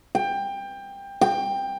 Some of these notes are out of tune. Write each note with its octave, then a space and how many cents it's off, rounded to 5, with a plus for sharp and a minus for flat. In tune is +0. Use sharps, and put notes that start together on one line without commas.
G5 +20
G5 +15